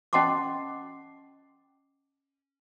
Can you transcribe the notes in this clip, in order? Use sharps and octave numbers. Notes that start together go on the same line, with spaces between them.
C#4 D#5 F#5 A5 C6 D6